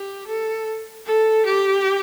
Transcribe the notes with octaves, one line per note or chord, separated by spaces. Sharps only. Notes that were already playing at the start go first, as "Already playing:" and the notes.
Already playing: G4
A4
A4
G4